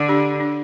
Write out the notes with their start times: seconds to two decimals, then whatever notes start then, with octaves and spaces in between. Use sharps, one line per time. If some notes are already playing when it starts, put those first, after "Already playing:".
Already playing: D3
0.08 D4 G4
0.40 D4